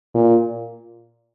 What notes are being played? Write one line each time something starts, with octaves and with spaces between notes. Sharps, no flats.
A#2